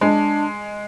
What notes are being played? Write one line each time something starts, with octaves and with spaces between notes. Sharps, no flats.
G#3 D4